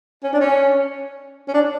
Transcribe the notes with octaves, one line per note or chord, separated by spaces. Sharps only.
C#4
D4
C#4
C#4
D4